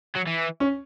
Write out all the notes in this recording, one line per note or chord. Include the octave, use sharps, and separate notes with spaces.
F#3
E3
C#4